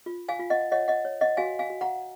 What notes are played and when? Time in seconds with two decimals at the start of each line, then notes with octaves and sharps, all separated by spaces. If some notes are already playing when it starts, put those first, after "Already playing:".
0.06 F4
0.29 F5 G#5
0.39 F4
0.50 D#5 F#5
0.72 C#5 D#5 F#5
0.88 D#5 F#5
1.05 C#5
1.21 D#5 F#5
1.37 F#4 F5 G#5
1.59 F5 G#5
1.70 F#4
1.81 F#5 A#5